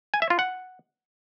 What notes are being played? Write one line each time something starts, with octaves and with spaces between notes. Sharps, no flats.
G#5
E5
F4
F#5